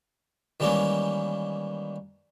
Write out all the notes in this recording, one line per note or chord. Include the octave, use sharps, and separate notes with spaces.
D#3 E3 G3 G#3 A#3 C#4